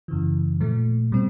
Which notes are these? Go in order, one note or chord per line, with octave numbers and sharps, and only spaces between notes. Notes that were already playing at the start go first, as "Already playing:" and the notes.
F#2 C#3 E3
A#2 F3 A3
B2 G3 C4